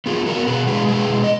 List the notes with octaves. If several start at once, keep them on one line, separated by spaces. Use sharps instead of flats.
B3 F4 G#4
B3 F#4 A#4
B2 G#4 B4
G#3 G#4 B4
B2 G#4 B4
G#3
D#5